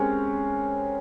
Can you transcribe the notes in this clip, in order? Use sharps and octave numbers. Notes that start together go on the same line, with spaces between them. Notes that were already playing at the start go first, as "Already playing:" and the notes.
Already playing: G#3 C4 C#4 G4 A#4